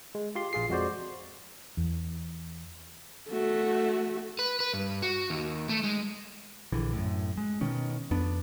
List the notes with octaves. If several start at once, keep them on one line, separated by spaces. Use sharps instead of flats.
G#3
F4 G4 C6
A#1 F4 G#4 C7
F2 G#3 F#4 C5 D5
E2
A3 F#4
B4
B4
G2
F#4
D#2
A3
G#3
A#1 D3 E3
F#2 A2
G#3
B2 D#3 C#4
F2 B3 D4